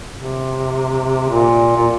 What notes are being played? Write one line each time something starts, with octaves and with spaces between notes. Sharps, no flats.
C3
A#2
A#2